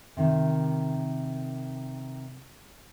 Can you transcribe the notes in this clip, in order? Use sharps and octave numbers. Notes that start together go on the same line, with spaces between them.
C3 D#3